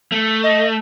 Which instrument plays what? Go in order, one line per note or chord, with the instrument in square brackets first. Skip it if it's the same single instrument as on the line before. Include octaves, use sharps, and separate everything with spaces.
[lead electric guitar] A3
[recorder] D#5